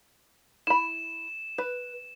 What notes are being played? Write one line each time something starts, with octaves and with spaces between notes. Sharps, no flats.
E4 B5 E7
B4